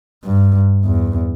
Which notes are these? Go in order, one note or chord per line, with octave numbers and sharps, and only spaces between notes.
G2
E2